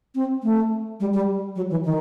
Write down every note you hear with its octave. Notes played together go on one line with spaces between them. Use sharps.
C4
A3
G3
G3
F#3
E3
D#3